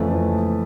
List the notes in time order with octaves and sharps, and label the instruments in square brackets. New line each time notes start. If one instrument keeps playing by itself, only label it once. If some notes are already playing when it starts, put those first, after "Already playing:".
Already playing: [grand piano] F2 C#3 E3 A3 A5